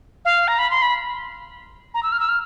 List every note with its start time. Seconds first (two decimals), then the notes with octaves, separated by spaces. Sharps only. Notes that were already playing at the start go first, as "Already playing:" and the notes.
0.25 F5
0.48 A#5
0.58 B5
0.70 C6
0.82 B5
1.94 A#5
2.03 E6
2.12 F6
2.20 E6
2.28 F6